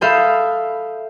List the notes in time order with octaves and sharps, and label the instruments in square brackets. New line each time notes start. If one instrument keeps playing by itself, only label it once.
[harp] A4 E5 F5 B5 D#6 G6